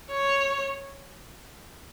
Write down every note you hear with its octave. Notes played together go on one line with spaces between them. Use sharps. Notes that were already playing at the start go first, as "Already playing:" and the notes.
C#5